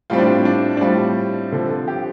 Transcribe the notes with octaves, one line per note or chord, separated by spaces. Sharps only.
A2 G3 C4 F4
D4
F4
D4
D4
A2 G3 C4 F4
D3 F3 C4 A4
A4
G4